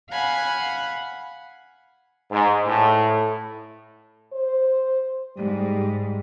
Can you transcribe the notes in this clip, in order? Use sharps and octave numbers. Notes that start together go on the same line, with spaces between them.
F5 F#5 G#5 B5
G#2
A2
C5
G#2 G3